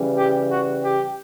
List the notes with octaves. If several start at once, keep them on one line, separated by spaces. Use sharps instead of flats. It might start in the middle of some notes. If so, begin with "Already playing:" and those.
Already playing: C#3 E3 G3
G4
F#4
G4